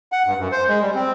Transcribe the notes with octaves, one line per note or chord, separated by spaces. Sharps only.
F#5
G2
F#2
C5
G#3
G3
C4